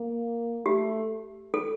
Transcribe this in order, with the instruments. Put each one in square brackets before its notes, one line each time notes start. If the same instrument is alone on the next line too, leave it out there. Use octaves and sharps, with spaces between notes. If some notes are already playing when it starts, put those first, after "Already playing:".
Already playing: [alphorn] A#3
[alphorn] A3 [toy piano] G4
[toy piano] A4